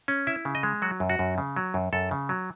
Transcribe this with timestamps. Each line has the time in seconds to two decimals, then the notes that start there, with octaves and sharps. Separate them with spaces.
0.08 C#4
0.27 E4 E5
0.45 C#3
0.55 D#5
0.63 G#3
0.82 F#3 F#4
1.00 F#2
1.09 F#4
1.19 F#2
1.38 C#3
1.56 F#3
1.74 F#2
1.93 F#2 A4
2.11 C#3
2.29 F#3